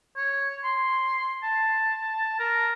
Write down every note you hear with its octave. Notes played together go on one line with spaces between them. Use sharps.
C#5
C6
A5
A#4